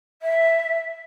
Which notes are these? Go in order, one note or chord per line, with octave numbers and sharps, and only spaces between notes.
E5